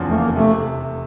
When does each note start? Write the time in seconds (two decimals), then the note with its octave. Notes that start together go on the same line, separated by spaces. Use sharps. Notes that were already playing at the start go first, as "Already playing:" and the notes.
Already playing: F1 E2 C#3 F3
0.09 A3
0.14 A#3
0.36 C3 A3